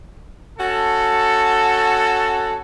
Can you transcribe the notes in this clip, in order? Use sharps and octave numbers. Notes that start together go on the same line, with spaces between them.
C#4 F#4 A4